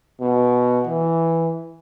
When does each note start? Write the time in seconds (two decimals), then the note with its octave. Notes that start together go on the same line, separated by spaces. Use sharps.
0.21 B2
0.87 E3